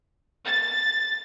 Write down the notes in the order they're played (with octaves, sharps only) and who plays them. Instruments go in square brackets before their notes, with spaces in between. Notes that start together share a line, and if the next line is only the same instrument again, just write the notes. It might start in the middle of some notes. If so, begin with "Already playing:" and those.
[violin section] A6